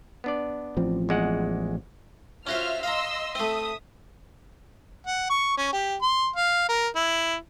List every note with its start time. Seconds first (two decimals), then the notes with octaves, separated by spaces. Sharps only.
0.24 B3 D4 D5
0.77 A1 F3 C4
1.09 E2 G#3 F#5
2.47 C#4 F4 F#4 C5 E5 F6
2.83 D#5 F5 A#5 C6 E6
3.35 A3 C4 E5 D#6
5.07 F#5
5.30 C#6
5.57 C#4
5.73 G4
6.02 C6
6.36 F5
6.69 A#4
6.96 E4